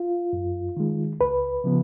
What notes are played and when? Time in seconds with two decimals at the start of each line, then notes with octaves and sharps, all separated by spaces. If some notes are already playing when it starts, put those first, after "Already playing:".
Already playing: F4
0.33 F#2
0.77 D#3 G#3
1.20 C#2 B4
1.64 C#3 F3 B3